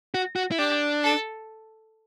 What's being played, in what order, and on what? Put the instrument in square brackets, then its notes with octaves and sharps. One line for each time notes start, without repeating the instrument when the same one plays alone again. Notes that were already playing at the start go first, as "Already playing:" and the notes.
[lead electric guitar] F#4
F#4
E4
[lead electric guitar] D4 [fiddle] G4
[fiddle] A4